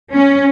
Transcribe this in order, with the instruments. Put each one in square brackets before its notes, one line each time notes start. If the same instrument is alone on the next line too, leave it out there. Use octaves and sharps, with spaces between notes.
[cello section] C#4